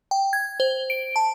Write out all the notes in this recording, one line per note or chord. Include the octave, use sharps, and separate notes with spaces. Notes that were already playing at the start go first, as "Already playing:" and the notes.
G5
G#6
C5
D7
A5